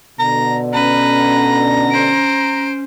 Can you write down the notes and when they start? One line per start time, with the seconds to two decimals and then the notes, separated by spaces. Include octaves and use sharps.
0.19 B2 D3 A#5
0.73 C#4 B4 A#5
1.92 C5 D7